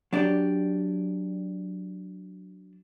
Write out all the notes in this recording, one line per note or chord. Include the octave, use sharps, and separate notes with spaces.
F#3 D4 G4 D5